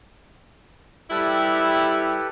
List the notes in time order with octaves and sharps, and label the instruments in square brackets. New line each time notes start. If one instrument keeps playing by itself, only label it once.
[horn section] G3 E4 [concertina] G4 A4 B4